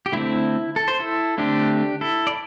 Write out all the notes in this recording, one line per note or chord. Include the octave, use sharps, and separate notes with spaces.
G4
D3 A3 C4 E4
A4
C5
E4 A4
D3 A3 C4 D4 G4
E4 A4
D5